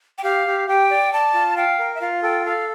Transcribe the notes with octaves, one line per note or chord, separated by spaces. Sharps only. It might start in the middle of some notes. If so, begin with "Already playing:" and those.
G5
G4 F5
G4
G4 G5
D5
D5 A5
F4
F5 G5
A#4
E5
F4 F5
A4 G5
A4 F5